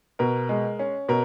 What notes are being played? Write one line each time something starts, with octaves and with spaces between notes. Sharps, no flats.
B2 A#4
G#3
C#4
B2 A#4